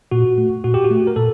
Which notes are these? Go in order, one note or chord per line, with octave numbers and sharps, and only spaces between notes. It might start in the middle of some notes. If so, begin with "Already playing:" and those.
A#2 F#4
A3
A#2 F#4
G4
F#4
A3
A#4
A#2 A4